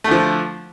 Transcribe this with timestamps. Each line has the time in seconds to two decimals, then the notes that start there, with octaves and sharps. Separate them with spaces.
0.04 A3
0.08 D3
0.11 F3